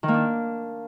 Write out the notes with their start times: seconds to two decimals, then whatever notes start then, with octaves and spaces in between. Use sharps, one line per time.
0.03 D#3
0.08 A#3
0.14 D4